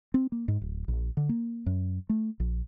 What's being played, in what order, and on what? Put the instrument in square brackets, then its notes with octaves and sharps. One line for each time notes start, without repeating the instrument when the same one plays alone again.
[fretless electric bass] C4
A#3
G#2
D1
A#1
D3
A#3
F#2
A3
A#1